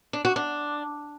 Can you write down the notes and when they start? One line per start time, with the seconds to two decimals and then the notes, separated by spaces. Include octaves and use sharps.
0.13 D4
0.25 F#4
0.36 D4